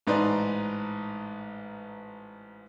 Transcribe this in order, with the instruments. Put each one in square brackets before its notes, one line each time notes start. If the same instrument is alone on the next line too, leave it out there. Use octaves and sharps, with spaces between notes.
[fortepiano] A1 G#2 D#4 B4 D5 C6